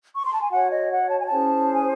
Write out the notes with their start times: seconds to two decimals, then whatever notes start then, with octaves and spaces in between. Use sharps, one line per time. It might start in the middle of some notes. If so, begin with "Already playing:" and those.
0.13 C#6
0.23 C6
0.32 A5
0.41 G#5
0.50 F#4 C#5 F#5
0.71 D#5
0.90 F#5
1.10 A5
1.18 G#5
1.26 A5
1.31 C#4 E4 G#4 C5
1.72 G#5